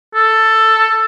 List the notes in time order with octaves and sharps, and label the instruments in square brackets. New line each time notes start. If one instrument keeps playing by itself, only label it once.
[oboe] A4